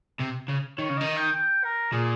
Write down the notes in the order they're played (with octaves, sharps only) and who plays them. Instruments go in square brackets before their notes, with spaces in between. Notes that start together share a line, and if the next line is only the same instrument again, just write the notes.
[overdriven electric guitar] C3
C#3
[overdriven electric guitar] D#3 [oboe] C#5
[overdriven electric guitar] C#3
[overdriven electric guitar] D#3 [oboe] D#5
[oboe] G5
G5
A#4
[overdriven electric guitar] A#2 [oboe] G#4